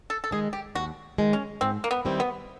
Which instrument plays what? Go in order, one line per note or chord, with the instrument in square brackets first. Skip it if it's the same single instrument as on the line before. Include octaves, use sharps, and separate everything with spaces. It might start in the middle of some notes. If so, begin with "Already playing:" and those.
[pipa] A4
A4
[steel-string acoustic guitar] D#3 G#3 [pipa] G#4
[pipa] G4
[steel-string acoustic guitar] D#2 [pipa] F#4
[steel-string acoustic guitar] D#3 G#3
[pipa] C#4
[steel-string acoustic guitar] G#2 [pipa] C4
[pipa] A#3
B3
[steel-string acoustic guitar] D#3 G3 C4 E4
[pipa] B3